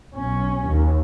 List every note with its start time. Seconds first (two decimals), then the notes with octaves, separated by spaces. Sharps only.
0.15 B1 C#4
0.67 D#2